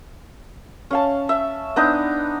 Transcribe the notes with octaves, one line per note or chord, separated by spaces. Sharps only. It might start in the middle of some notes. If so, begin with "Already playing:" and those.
C#4 F5 A5
E5
B3 D4 D#4